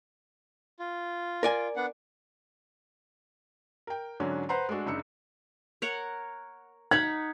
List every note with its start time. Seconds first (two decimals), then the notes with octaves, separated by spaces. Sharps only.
0.79 F4
1.43 A#4 D5 G#5
1.76 B3 D4 F#5
3.87 A#4 G5
4.20 G#2 D3 F#3 C#4 D4
4.49 B4 C5 F#5 A#5 C6
4.69 G#3 A3 D4 F#4 A4
4.86 F#1 C#3 D4 D#4 E6 C#7
5.82 A#4 C#5 F#5
6.91 D#4 F#5 B5 G#6